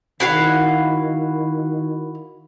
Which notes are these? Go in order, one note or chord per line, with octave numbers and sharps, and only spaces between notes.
D#3 E4 F#4 F5